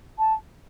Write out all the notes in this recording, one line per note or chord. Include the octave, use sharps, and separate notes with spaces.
A5